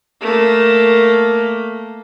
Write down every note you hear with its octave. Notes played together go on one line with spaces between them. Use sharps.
A3 A#3